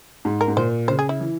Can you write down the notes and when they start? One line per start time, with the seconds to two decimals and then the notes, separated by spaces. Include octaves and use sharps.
0.25 G#2
0.41 A#4
0.48 G#2
0.57 A#2 C5
0.88 C#3 C5
0.99 G#4
1.09 E4
1.20 E3